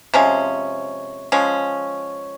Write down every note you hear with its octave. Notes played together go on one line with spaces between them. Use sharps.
C3 F3 G#3 C#4
F3 G#3 C#4